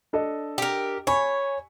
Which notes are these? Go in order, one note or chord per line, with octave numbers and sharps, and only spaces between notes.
D4 A4 D#5
G4 A#4
C#5 G#5 B5 C#6